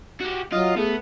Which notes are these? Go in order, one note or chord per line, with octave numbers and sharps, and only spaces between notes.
F#4 G4
F#3 F4 D#5
A3 B3 G#4